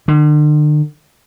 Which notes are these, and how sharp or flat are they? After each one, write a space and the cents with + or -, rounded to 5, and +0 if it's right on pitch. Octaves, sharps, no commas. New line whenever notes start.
D3 +40